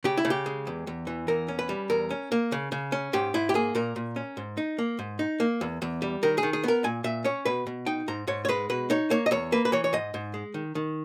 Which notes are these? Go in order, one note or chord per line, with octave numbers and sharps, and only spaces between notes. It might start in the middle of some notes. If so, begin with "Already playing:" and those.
C#3 G4
E4
C#3
G4
G#3
E2
E2
E3
E2 A#4
C#4
B4
G3
E2 A#4
C#4
A#3
C#3
C#3
C#4
G#2 G4
G#2 E4
G4
A#3 G#4
A#2 A#4
A#2
C#4
G#2
D#4
A#3
G#2
D#4
A#3
E2
E2
G3
D#3 A#4
G#4
D#3
G#4
B3 A#4
A#2 G#5
A#2 E5
C#4 C#5
B2 B4
B2
D#4 G5
G#2 A#5
G#2 C#5
C#5
G#3 B4
B2 B4
D#4 C#5
A#3 C#5
D#5
E2 C#5
A#3 B4
B4
E3 C#5
C#5
G#2 D#5
G#2
G#3
D#3
D#3